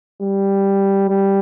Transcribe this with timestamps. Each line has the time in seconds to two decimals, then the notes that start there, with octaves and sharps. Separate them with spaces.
0.22 G3
1.09 G3